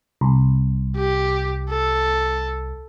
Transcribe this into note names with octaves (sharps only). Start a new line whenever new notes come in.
C2
G4
A4